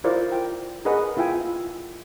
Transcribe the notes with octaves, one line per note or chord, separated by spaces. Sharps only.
E4 F4 A#4 C5 D5
G5
G#4 A#4 B4 D#5 F#5
E4 F4 E5 G5 G#5